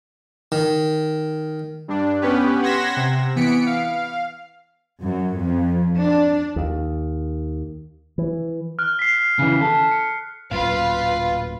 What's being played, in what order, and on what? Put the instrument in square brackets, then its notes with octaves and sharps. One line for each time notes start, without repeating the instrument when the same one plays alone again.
[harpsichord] D#3
[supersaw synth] G2 D4
B3 C#4 G4 B4
F#5 C6 G#6 A#6 B6 E7
C3
E3 B3 B6 C#7 D7
F5
[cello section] F#2
F2
D4
[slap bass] D#2
E3
[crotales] F6 F#6
B6 C7
[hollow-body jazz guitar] C#3 E3
A4
[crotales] C#7
[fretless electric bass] D1 F#2 A#2 [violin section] F4 B4 [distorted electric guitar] F5